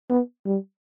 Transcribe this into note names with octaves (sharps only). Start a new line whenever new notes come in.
B3
G3